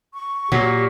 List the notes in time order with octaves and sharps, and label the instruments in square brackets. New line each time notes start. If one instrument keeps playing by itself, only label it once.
[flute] C#6
[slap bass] A#2 [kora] F#3 [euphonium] G4